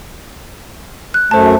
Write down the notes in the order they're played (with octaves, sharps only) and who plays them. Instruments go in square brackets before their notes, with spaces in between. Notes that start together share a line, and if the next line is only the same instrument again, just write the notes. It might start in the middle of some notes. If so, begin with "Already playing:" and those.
[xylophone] F#6
[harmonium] F#2 A3 [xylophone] C5 A5